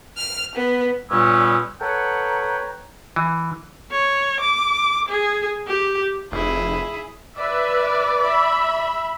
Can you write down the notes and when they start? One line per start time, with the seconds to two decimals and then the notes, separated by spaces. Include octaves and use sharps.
0.17 F6
0.56 B3
1.10 G2 A#2 G3 B3 C#4 E6
1.81 A4 B4 C#5 F#5 G5 A#5
3.16 E3
3.92 C#5
4.41 D6
5.09 G#4
5.68 G4
6.32 F1 E4 G#4
7.37 B4 D5 E5
8.20 E5 B5